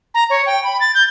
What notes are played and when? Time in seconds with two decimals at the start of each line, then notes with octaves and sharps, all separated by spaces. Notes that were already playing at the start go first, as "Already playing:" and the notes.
0.14 A#5
0.30 C#5
0.46 G5
0.64 B5
0.80 A6
0.95 G6